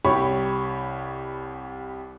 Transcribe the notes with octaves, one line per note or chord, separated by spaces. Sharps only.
C2 G4 C#5 B5 C#6